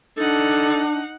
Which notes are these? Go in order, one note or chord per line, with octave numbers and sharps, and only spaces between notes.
D4 D#4 A4 F#5